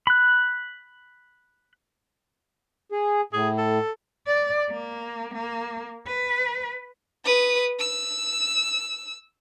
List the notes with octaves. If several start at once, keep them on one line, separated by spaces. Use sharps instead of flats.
B5 F#6
G#4
A2 G#4
A4
D5
A#3
A#3
B4
B4 D#6
E6